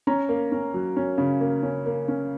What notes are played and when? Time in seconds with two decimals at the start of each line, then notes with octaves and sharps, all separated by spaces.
0.07 C#4 A#5
0.29 A#3
0.52 C#4
0.74 F#3
0.96 C#4
1.18 C#3
1.41 A#3
1.63 C#4
1.86 A#3
2.08 C#4